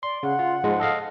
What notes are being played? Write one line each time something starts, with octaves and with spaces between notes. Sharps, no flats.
D5 C6
C#3 F#5
F4
G#2 F3 G#3
A4 D#5 F5